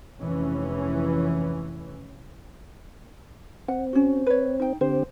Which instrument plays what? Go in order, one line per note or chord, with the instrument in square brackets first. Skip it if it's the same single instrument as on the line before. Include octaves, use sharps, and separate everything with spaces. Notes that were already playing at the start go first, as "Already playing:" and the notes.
[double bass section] F1 E3 C#4
[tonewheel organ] C4 [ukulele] F#5
[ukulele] C#4 F#4
B4 C#5
D#4 G5
[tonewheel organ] D3 C4 G4 [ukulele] C5